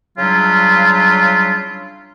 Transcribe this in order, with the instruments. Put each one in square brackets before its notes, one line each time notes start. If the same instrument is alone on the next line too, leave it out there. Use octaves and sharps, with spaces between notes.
[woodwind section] C#3 F#3 G3 D4 E4 F4